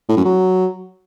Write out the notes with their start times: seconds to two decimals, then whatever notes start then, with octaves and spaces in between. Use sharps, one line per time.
0.09 A2
0.17 F#2
0.25 F#3